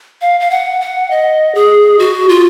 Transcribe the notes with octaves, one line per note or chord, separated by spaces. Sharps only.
F5
F5
F#5
F#5
D#5
G#4
F#4
F4